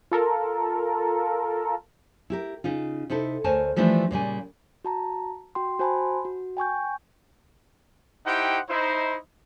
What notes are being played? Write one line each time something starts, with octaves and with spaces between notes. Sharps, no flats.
F4 A4 A#4
E4 G4 A#4
C#3 D#4 F4
C3 D#4 E4 A4
D2 A#4 C5 C#5 G#5 A5
E3 F3 G3 A3 D4 E4
A#2 C#3 G3 G#5
F#4 A5 A#5
F#4 G5 C6
F#4 C5 G#5 A5 B5 C6
F#4
G5 G#5 C#6 G6
D#4 E4 G4 C5 F#5 G5
D#4 E4 C5